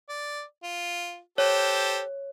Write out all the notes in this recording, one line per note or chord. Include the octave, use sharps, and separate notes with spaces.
D5
F4
G4 A4 C5 C#5